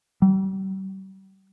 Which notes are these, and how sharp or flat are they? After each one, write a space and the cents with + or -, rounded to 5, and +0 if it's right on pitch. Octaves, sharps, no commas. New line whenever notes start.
G3 -40